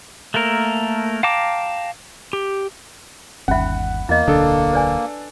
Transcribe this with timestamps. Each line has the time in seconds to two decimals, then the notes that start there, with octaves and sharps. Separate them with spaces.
0.34 A3 A#3 A4 A#4
1.23 F5 G5 A5 A#5 D6
2.33 G4
3.48 G1 D#2 C#4 E5 F#5 B5
4.09 E2 A#3 E4 D#5
4.27 D1 B1 D3 D4 A4 D#6
4.73 B4 D5 G#5